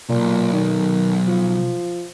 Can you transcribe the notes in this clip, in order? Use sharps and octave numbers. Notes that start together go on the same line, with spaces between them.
B1 A#2
D#3
F3